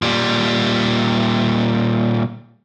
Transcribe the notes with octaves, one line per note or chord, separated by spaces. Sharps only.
A#2 G3